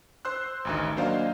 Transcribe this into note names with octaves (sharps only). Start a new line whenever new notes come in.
C5 C6 E6 F#6
A1 D2 D#3
F#3 A#3 D4 C5 D#5 F5